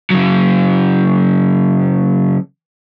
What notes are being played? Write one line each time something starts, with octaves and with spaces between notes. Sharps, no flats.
C#3 F#3